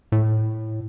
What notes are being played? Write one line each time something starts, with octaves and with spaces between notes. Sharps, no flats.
A2